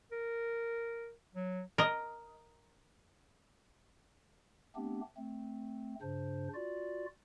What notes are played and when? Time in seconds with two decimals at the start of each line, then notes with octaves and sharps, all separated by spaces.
0.12 A#4
1.35 F#3
1.78 A#4 D#5
4.76 A3 B3 C4 D4 G4
5.17 A3 C4
6.02 G2 C#3 D4 C5
6.54 F4 F#4 D5